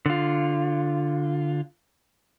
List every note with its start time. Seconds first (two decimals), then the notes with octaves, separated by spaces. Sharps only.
0.06 D3 F4